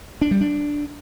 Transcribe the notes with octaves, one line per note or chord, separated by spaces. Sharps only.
D4
G3
D4